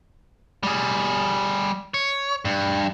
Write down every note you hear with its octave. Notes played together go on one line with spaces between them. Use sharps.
G3 G#4
C#5
G2